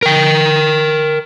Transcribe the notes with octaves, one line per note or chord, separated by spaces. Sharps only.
A#4 G5